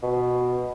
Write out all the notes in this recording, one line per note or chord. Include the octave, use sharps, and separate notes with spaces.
B2